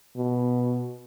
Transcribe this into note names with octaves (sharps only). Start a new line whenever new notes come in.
B2